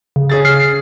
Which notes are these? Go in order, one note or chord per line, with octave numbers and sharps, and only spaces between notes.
C#3
C#4 G#4 A6
F6 C7